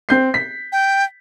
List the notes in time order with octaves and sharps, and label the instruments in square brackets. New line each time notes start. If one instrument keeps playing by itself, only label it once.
[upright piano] C4 G6 C7
B6
[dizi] G5